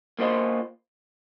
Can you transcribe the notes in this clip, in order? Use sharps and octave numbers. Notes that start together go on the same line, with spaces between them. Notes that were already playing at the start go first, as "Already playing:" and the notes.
A#3 F4 C5 D#5